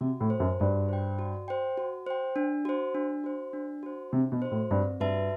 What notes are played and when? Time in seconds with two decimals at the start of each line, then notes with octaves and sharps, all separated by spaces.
0.01 C3 F#4
0.20 A2
0.30 C5 G5
0.40 F#2
0.60 G2 F#4
0.89 C5 G5
1.19 F#4
1.48 C5 G5
1.77 F#4
2.07 C5 G5
2.36 D4
2.65 F#4 C5
2.95 D4
3.24 F#4 C5
3.53 D4
3.83 F#4 C5
4.12 C3 D4
4.32 B2
4.42 F#4 C5
4.51 A2
4.71 G2 C4
5.00 G2 F#4 B4 E5 A5